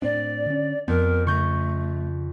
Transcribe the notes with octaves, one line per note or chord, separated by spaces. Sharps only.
A2 C4 D4 D5
D3 C#4
F2 B3 C4 A#4
C#3 A3 C#6 G6 A#6